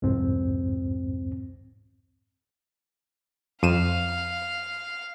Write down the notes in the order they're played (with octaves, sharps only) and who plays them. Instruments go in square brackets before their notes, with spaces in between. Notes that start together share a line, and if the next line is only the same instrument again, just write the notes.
[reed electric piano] C2 F2 G#2 C4
[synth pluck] F2 D#7 E7 [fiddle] F5